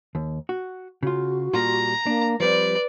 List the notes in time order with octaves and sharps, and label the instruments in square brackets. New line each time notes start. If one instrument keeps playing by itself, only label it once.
[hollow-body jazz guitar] D#2
F#4
[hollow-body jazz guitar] C#3 F4 [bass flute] F#4
[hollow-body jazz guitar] A#2 G3 F4 [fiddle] A#5
[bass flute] A#3 [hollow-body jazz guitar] D4
[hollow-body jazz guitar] F3 G3 C4 [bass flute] B4 [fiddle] D5